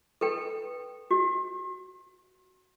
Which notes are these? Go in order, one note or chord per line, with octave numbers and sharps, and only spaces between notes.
A4 B4 G5
F#4